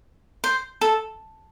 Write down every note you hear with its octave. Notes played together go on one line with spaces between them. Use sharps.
C5
A4